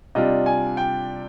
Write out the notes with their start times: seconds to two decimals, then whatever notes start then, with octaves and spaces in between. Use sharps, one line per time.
0.15 C3 G3 D4 F4 D#5
0.46 G#5
0.77 G5